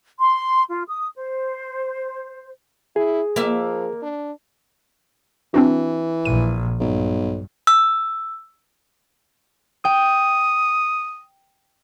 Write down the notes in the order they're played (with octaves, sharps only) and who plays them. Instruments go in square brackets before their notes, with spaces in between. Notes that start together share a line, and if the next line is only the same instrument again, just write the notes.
[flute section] C6
F4
D#6
C5
[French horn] E4 [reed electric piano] G#4
[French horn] F3 [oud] A#3 E5
[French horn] D4
[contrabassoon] E3 [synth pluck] C4 D4 F#4
[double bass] A#1 [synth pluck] D#7
[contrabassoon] B1 [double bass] G2
[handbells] E6
[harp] G5 [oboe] D#6